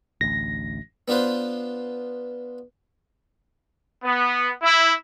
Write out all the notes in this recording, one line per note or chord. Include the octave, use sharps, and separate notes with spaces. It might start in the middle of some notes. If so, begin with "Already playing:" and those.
A1 D2 A#6
B3 D4 F4 B4 C5
B3
E4